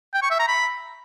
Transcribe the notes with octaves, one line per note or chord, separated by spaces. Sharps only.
G5
C#6
E5
A#5
B5